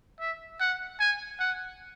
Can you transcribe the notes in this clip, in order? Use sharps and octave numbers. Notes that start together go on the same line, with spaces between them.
E5
F#5
G#5
F#5